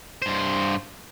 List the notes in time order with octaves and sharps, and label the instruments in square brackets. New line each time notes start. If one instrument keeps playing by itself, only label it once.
[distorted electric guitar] G2 C5